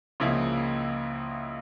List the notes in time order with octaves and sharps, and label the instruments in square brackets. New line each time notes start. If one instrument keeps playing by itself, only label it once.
[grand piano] C#2 C#3 F3 A#3 E4